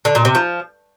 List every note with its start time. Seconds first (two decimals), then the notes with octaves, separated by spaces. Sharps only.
0.05 D3
0.15 A#2
0.25 C3
0.35 F3